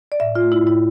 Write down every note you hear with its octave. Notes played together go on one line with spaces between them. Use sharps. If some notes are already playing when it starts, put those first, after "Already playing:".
D5
A2 E5
F4
A3
E4
A2 E4